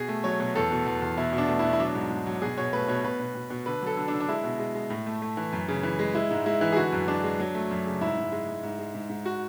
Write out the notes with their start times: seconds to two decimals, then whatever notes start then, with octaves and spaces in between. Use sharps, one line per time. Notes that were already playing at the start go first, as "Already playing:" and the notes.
Already playing: B2 G#4
0.09 A3
0.24 F#3 C#5
0.40 B2
0.55 E2 A4
0.71 B2
0.86 E2
1.02 E2
1.17 B2 E4
1.33 B2
1.38 D4
1.49 A3
1.59 E4
1.65 B2
1.73 E4
1.80 F#3 D4
1.95 G#2
2.11 G#2
2.26 F#3
2.42 B2 G#4
2.57 B2 C#5
2.73 A3 B4
2.88 B2 C#5
3.04 B2 B4
3.20 B2
3.35 B2
3.50 B2
3.66 D3 B4
3.82 F#3 A4
3.97 D3
4.08 D4
4.13 D3
4.20 D4
4.29 G#3 E4
4.44 B2
4.59 G#3
4.75 G#3
4.90 A2
5.06 A3
5.22 A3
5.37 E3
5.53 F#2
5.68 C#3
5.83 E3
5.99 G#3
6.15 G#3 E4
6.31 G#2
6.46 G#3 E4
6.61 E3
6.72 G#4
6.76 D3 F#4
6.92 F#2
7.08 G#3 D4
7.24 G#3
7.39 F#3
7.55 A3
7.71 F#2
7.86 C#3
8.01 G#2 E4
8.17 G#2
8.32 G#3
8.48 G#3
8.63 G#2
8.79 G#3
8.95 G#2
9.10 G#2
9.26 F#4